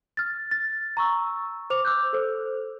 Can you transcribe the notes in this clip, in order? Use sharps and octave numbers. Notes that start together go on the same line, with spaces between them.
F6 A6
A6
A#5 C#6 E6
C5 D6 F7
D6 E6 F#6 G6
A4 C5